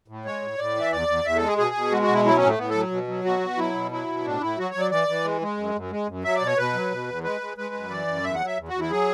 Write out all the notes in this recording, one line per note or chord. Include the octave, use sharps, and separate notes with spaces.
A2
G#3 C#5
A2
A2 D5
E3 E5
E2 D5
E2
E2 E5
G#3 A4
G#4
B2 G#4
B2
G#3 F#4
F#4
B2
E4
F#3 E4
C#4
A2
A3
A2 B3
F#3 A4
B2
F#3
B2 F#4
B2
F#3 E4
B2
F#3 E4
B2
A2 D4
A2 E4
F#3 F#4
C#5
F#3
D5
E3 D5
E3
G#3
G#3
F#2
F#2
G#3
F#2
F#3 E5
D5
B2
C#5
B2 B4
F#3
B2
E2
G#3 B4
G#3
G#3 B4
F#2
E3 D5
F#2
E2 E5
F#5
F#3
E5
E2
E2 F#4
E4
F#3 G#4